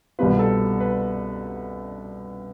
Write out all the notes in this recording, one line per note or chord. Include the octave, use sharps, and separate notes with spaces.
C2 B2 G3 C4 F4 B4
A4
B4